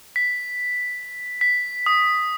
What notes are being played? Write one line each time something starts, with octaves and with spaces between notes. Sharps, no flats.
B6
B6
D#6